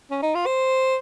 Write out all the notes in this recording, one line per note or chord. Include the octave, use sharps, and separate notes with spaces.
C#4
D#4
F4
C5